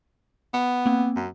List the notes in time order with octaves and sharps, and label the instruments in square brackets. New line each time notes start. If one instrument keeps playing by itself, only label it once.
[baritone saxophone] B3
[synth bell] A#3 C4
[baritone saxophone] F#2